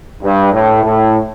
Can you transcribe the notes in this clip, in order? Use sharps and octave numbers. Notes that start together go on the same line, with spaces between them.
G2
A2
A2